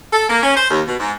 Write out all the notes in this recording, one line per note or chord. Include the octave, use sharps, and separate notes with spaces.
A4
A#3
C#4
C5
D#2
B2
G#2